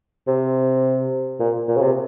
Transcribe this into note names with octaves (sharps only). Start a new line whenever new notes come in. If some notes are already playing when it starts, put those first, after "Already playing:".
C3
A#2
A#2
C#3
C3